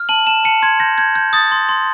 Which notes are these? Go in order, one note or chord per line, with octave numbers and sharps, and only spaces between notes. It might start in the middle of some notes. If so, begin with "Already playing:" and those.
Already playing: F6
A5 F#7
A5 E7
A5 C#7
C6 G#6
G6 A#6
G6 G#6
G6
D#6 A6
C6
C6